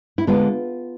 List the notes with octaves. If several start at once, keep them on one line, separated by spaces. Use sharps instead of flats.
E4
D3 G#3 B3 F4